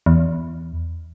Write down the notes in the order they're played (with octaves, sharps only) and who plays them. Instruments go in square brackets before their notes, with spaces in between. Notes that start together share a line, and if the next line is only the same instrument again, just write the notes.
[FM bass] E2